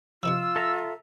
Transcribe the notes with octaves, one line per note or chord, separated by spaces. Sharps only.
C3 D#3 F3 F4 E6
A4 E5 A#5